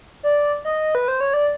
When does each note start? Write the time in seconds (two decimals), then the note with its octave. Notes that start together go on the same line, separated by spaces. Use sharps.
0.23 D5
0.65 D#5
0.95 B4
1.08 C5
1.20 C#5
1.34 D5